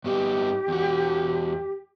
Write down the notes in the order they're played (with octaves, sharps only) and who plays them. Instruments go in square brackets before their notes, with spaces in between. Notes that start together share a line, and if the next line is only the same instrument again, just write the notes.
[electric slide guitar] G2 B3 D#4 [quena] G4
[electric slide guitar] E2 F#4